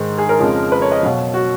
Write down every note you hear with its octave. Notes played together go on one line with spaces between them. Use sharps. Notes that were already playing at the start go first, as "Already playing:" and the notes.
Already playing: G#2 D#3 G#3
G#4
A#4
F2 C#3 F3 G#3
B4
C#5
D#5
B2 F#3 F5
F#4